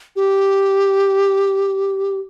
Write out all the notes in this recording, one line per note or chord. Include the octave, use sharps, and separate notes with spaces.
G4